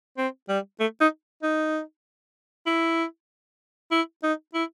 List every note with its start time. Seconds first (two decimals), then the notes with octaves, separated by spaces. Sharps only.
0.18 C4
0.49 G3
0.80 A3
1.01 D#4
1.43 D#4
2.66 E4
3.91 E4
4.23 D#4
4.54 E4